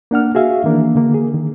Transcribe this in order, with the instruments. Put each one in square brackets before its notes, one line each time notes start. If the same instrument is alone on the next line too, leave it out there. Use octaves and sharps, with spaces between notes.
[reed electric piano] A#3 D4 F#5 F6
F#4 G#4 E5 F5
D#3 E3 A#3 D4
D3 A#3
G#4
D#3